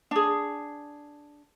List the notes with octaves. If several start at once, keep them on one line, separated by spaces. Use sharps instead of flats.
D4 G#4